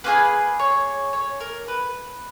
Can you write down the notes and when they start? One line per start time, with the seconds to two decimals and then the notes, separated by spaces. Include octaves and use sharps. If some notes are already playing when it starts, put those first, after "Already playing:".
0.04 A#3 F4 G#4 B4
0.59 C#5
1.13 C#5
1.40 A#4
1.68 B4